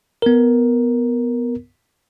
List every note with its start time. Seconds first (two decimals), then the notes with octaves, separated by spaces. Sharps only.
0.22 B3 A#4